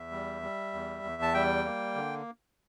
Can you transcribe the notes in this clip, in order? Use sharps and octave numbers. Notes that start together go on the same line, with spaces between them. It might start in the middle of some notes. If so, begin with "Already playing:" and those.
Already playing: E2 E5
G3
G3
E2
E2
A5
G3 G5
A#3
D3